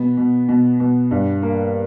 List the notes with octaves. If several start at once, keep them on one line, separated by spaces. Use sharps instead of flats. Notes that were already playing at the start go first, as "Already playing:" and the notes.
Already playing: B2 B3
B2
B2
B2
G2
A#3